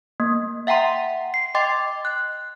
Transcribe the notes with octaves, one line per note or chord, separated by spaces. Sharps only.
A#3
E5 F#5 G5 A#5 C6
C7
D#5 G5 C6 D6 A6
F#6